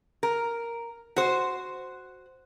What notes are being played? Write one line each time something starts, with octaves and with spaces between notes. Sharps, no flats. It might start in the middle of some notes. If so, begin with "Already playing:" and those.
A#4
F#4 C5